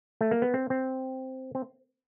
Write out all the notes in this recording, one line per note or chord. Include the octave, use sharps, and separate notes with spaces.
A3
A#3
B3
C4
C4
C4